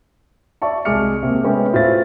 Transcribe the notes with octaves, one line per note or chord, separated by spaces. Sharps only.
D5 E5 A5 C#6
C2 G#3 G#4 D6 F6 C#7
C3 A#3
G#3 A3 B3 C#4 G5
A2 F4 C5 E5 A6